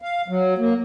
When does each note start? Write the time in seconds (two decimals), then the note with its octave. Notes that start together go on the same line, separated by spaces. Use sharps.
0.02 F5
0.28 F#3
0.58 A#3